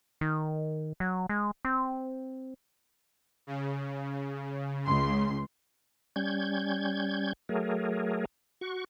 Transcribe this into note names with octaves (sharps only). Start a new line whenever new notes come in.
D#3
F#3
G#3
C4
C#3
C#2 C6
G3 C#4 G6 G#6
F#3 A3 G#4 A#4
F#4 C#6